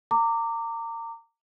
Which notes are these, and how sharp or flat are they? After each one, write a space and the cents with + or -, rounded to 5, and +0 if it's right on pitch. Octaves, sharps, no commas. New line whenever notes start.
A#5 -30 D6 +0